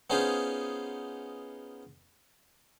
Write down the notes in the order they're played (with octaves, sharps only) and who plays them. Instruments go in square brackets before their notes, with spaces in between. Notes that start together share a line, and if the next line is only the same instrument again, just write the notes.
[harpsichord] B3 C#4 D#4 F4 G#4 C5